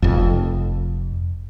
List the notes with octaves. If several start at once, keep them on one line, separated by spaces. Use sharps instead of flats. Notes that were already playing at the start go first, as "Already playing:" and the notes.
F1 F2